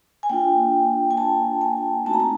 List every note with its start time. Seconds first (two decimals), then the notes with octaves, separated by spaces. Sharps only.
0.23 G#5
0.30 A#3 D4 F4 G5
1.11 G#5
1.17 A5
1.61 G#5
2.05 A3 C4 D#4 F#4 A5
2.13 A#5
2.20 A5